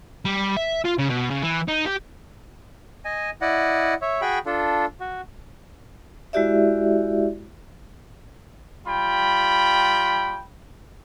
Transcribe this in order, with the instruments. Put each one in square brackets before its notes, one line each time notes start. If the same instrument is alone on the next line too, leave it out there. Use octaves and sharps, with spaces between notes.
[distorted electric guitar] G3
E5
F4
C#3
B2
C#3
E3
D#4
G4
[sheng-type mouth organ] D#5 G#5
E4 D5 D#5 F#5
C#5 E5
F#4 G#4 G5 B5
D4 F4 A4
F#4
[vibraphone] G#3 E4 F#4 G4 D5 E5
[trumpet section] G3 F4 G5 B5